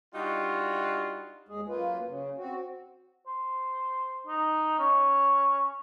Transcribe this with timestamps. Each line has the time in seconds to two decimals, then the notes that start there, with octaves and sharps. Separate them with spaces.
0.14 G3 D4 D#4 F4 F#4
1.49 D#2 G#3 G#4
1.68 F#2 A#3 F4 B4
2.07 C#3
2.38 C4 F#4
3.27 C5
4.27 D#4
4.79 C#4